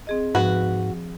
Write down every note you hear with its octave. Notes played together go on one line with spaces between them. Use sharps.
C4 G#4 D#5
G#2 F3 F#4 B4